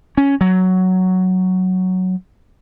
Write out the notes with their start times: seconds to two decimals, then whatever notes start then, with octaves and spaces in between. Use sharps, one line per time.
0.17 C#4
0.41 F#3